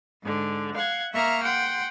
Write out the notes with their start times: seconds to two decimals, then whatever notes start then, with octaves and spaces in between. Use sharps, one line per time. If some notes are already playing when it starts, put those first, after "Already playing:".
0.23 G#2 D3
0.75 F5 F#5 G#6
1.13 A#3 E5 A#5 C#6 F6
1.42 F#5 G5 C6